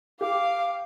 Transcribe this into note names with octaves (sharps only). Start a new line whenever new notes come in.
G4 F5 D6